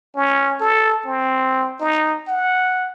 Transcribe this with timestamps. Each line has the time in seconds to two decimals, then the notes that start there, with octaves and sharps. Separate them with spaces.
0.16 C#4
0.61 A4
1.06 C4
1.80 D#4
2.28 F#5